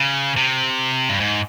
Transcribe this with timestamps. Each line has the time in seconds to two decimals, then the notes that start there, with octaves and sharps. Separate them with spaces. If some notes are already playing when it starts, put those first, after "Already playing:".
Already playing: C#3
0.37 C3
1.09 G2
1.20 G#2